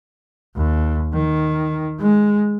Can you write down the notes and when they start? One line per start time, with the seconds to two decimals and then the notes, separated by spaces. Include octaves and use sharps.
0.56 D#2
1.13 D#3
1.99 G#3